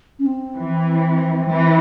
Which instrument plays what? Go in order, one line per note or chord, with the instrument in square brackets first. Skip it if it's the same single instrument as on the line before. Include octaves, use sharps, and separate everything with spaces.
[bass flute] C#4
C4
[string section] E3
E3